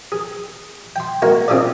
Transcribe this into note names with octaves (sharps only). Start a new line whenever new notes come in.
G#4
G5 C6
G#3 A#3 F#4 A#4
C4 D4 F4 G#4 A4 D5